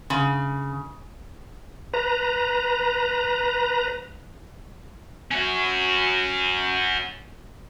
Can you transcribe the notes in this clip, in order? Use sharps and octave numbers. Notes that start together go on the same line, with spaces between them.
C#3
B4 A#5
C#4 F#4